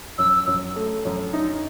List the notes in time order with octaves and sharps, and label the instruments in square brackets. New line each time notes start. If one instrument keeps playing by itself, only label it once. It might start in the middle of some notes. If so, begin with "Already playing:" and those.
[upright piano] F#2 [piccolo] E6
[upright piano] F#2
A3
F#2
D#4